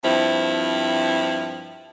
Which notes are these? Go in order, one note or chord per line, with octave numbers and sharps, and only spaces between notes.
G2 F3 C4 E4